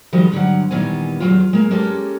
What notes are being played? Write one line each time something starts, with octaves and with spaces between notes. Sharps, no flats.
D#3 F3 G3 G#3 F#4 D#5
G2 D3 F#3 F#5
A#2 D#3 E3 G3 B3 G#5
E2 D#3 F#3 F4
G#3 A#3
G#3 A#3 C#4 G4 A4